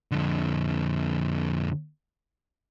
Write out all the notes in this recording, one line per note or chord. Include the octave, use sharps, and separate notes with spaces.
F2 D3